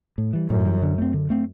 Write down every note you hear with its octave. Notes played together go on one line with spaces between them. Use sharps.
A2
E3 G3
F#2 A2
E3 G3
D3
A3 C4
D3
A3 C4